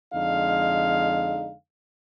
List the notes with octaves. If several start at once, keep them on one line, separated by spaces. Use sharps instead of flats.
F2 D3 G#3 D#4 F5